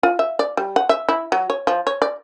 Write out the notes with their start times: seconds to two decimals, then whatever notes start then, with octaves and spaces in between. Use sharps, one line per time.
0.03 F4
0.19 E5
0.39 D5
0.57 G3
0.76 F#5
0.89 E5
1.09 E4
1.32 F#3
1.50 C#5
1.67 F3
1.87 C#5
2.02 D5